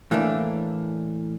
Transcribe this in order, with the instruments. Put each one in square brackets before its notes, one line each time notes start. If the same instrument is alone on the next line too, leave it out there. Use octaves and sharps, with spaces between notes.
[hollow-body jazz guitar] A2 E3 A3 A#3 D4